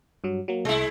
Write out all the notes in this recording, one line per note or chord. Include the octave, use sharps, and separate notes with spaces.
G2 F#3
F#3 A#3
C2 G#3 E4